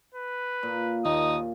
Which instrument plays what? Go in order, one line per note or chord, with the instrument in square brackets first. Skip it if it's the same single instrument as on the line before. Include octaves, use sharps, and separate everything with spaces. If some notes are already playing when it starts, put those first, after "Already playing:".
[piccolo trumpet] B4
[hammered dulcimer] A#2
[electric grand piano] D#2 [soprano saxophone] D#4 [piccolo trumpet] D#6